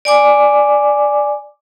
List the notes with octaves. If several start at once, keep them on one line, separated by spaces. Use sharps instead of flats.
D5 G#5 D6